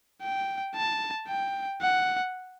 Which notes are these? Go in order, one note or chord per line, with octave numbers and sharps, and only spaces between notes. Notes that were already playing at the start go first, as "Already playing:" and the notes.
G5
A5
G5
F#5